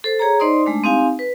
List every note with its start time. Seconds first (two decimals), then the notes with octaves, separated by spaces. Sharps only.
0.04 A4 C5
0.19 G#4 C#5 A#5
0.40 D#4 C5 D5 D#5 C6 D#6
0.66 G#3 A3 D4
0.84 C4 D#4 G4 F5 G#5
1.19 B4